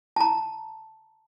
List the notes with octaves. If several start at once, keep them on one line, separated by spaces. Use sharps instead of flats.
A5 A#5